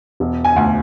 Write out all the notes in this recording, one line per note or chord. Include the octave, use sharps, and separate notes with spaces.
E1
G#5
D2